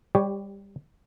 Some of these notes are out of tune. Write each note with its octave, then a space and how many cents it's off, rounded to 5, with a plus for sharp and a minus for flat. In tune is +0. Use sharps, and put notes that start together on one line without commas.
G3 +20 G4 +0 C#5 +0